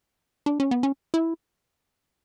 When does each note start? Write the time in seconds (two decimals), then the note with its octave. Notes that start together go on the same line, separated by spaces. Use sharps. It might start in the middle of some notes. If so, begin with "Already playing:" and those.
0.46 D4
0.60 C#4
0.71 B3
0.83 C#4
1.14 E4